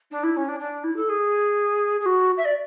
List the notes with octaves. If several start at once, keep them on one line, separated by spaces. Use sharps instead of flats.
D4
E4
C#4
D4
D4
E4
A4
G#4
G#4
F#4
E5
D5